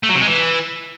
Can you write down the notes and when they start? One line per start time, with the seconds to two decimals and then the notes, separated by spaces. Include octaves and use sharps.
0.03 A3
0.09 F#3
0.15 C3
0.21 G#3
0.27 E3